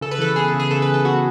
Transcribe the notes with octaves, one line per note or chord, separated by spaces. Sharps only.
C#3 A4
B4
E3 A4
B3 G#4
A4
C#3
G#4
C#3 A4
B4
E3
A4
B3 F#4